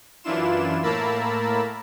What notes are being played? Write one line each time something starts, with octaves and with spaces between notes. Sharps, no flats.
F#2 E3 D4 E4 F4 E7
A2 A#3 A#4 A5 B5 E6